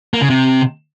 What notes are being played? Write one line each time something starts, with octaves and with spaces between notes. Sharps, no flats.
A#3
C#3
C3